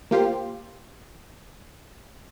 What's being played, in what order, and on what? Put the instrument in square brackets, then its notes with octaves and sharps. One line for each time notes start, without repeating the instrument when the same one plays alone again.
[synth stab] A#3 F4 G4 C5